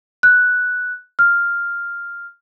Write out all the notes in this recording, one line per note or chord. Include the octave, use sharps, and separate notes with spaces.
F#6
F6